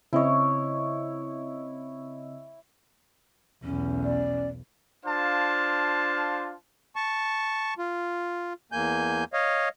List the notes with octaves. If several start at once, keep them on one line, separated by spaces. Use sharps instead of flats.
C#3 C4 E4 C#5 D#5
B1 E2 C#4
D5
D4 F4 C5 F5 A5
A5 C#6
F4
E2 A#3 G#5 G6
C#5 D#5 F5